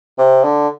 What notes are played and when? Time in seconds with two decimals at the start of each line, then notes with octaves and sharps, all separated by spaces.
0.18 C3
0.44 D3